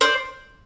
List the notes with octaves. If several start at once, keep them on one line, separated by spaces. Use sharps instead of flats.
C5 D5